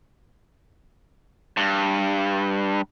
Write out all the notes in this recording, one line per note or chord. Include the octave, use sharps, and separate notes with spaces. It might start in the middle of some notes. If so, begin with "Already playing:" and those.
G2